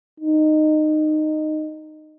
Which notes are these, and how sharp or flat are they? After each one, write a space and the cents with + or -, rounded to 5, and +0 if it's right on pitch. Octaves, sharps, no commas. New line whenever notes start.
D#4 -15